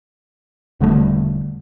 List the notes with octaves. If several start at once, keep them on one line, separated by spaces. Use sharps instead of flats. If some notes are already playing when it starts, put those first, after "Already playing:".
E1 D3 G3 A3